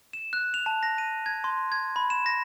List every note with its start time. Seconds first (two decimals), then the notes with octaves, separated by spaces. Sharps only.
0.13 E7
0.33 F#6
0.54 F7
0.66 A5
0.83 A#6
0.98 D#7
1.26 G#6
1.44 C6
1.72 G#6
1.96 B5
2.10 E7
2.26 A#6